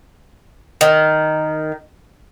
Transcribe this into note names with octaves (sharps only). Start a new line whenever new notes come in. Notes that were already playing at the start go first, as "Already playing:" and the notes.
D#3